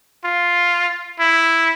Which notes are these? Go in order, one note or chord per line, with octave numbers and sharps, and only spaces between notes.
F4
E4